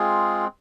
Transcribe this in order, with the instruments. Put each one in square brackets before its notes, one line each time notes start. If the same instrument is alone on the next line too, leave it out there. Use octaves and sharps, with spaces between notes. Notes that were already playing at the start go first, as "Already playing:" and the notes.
Already playing: [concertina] G#3 C4 F4 G#4